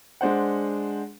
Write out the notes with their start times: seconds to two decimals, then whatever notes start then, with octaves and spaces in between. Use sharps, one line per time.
0.21 G#3 D4 C5 F#5